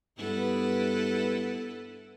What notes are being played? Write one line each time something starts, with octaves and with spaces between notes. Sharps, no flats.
G2 B3 E4 A4 B4